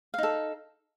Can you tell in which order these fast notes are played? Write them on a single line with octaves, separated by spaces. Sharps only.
F5 D#4 A4